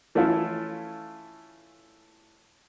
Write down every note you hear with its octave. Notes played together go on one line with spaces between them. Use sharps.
E3 A3 C#4 E4 F4